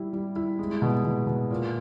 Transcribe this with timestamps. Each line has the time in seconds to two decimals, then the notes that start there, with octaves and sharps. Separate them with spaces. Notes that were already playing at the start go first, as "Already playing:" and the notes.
Already playing: G3 E4
0.13 G3
0.36 E4
0.59 G#3
0.82 B2
1.05 B2
1.27 B2
1.50 A#2